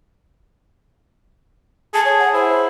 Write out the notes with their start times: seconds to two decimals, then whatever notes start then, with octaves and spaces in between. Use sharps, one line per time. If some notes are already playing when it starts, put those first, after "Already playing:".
1.94 G#4 A5
2.05 C#5
2.19 F#5
2.34 E4 C5